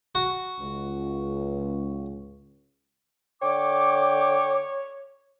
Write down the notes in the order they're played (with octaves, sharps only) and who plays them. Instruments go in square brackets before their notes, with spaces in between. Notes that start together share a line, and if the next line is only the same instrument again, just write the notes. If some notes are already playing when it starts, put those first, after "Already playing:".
[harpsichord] F#4
[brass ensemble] C#2
[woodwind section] D3 G5 D6 [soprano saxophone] C#5